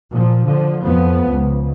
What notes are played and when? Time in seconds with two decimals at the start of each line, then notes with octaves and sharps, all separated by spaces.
0.10 A#2 F3
0.45 D3 F3
0.84 F2 F3 B3
1.29 C#2